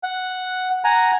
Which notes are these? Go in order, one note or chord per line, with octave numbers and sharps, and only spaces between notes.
F#5
F#5 G#5 A#5